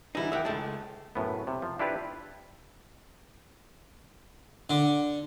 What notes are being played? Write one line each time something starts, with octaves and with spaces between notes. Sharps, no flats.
D3 E3 G3 D#4 E4
D#2 A#3 E5 F#5 G5
C#2 G#3 A3 A5
F#2 A2 B3
C3
F3
D4 E4 F4 G4 B4 F5
D3